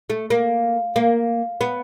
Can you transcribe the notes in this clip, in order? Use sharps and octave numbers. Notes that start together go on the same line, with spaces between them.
A3
A#3
A#3
B3